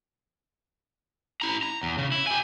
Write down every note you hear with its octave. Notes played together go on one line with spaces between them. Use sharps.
E4 A#5
A#5
E2
C#3
E4
G4 G#5